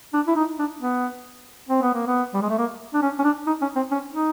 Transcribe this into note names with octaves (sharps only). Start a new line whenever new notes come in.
D4
E4
D#4
D4
B3
C4
B3
A#3
B3
G3
G#3
A3
A#3
D4
C#4
C#4
D4
D#4
C#4
C4
C#4
D#4